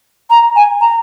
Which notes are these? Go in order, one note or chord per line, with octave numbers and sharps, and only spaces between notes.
A#5
G#5
A#5